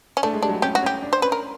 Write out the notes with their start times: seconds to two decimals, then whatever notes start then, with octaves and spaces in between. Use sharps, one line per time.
0.17 C#4
0.23 A3 D4
0.33 G#3
0.42 G3 D4
0.49 F#3
0.53 G3
0.62 C#4 G4
0.75 F#4
0.83 C#4 G4
1.02 D4
1.13 C5
1.22 C#4 B4
1.32 A#4